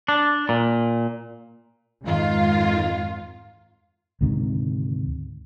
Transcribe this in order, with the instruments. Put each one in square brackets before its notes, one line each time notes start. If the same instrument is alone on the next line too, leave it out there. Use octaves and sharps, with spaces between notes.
[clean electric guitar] D4
A#2
[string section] F2 G#2 D#3 F4
[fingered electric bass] D2 G#2 C3 D#3